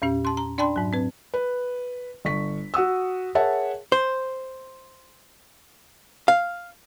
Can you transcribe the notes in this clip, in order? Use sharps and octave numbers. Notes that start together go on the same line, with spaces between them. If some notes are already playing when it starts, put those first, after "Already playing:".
E2 A#2 C#4 G4
A5 C6
A#5
D4 D5 G5 A5 B5 C6
G#2 F#3
C4 B4
B4
G1 C#6 B6
F#4 F#5 D#6 E6
G#4 A#4 C#5 E5 F#5 A5
C5
F5